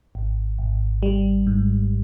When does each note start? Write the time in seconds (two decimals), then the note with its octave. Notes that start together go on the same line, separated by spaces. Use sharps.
0.15 G#1
0.59 G#1
1.03 G3
1.47 G#2